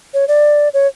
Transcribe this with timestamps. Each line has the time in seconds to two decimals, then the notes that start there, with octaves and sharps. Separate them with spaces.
0.14 C#5
0.28 D5
0.74 C#5